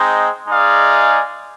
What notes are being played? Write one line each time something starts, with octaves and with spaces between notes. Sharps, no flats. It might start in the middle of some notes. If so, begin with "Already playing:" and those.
Already playing: G#3 C4 D#4
G#3 D#4 G#4 D5 F5